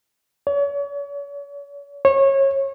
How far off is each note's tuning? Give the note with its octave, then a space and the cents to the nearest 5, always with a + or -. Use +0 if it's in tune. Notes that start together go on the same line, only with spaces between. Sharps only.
C#5 +40
C#5 -25